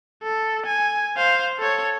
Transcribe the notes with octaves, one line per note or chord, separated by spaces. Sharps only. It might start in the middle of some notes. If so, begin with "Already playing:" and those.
A4
G#5
C5 F5
A4 C#5